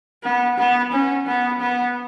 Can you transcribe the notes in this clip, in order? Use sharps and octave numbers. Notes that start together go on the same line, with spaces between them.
B3
B3
C#4
B3
B3